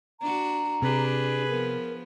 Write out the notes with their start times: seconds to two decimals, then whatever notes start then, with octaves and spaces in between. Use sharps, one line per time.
0.21 D4 F#4 A#5
0.82 C3 D4 G4 G#4 B4
1.48 F3 B3 A#4